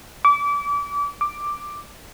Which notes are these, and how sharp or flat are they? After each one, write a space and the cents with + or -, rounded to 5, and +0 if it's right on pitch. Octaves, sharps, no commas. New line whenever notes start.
D6 -30
D6 +5